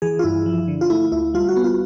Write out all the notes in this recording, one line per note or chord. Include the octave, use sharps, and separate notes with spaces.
E3 G#4
F4
G2 E4
F3
D3
F4
A3 E4
D2 E4
G3 F4
F#4
B3
F4